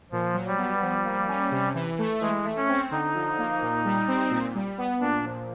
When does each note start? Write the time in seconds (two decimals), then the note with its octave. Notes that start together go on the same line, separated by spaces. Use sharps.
0.11 A#2 F3
0.34 F#3
0.46 G3
0.58 B3
0.82 F3
1.04 A#3
1.28 C#4
1.51 C3
1.75 E3
1.99 A3
2.21 E3 G#3
2.45 A3
2.56 C#4
2.68 C4
2.91 D3 D#4
3.14 F3
3.38 A#3
3.62 A#2
3.85 G3
4.08 C4
4.31 A#2
4.55 G3
4.78 B3
5.01 A#2 D4
5.24 F3